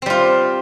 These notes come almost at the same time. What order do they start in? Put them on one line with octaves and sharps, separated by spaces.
C4 G3 F4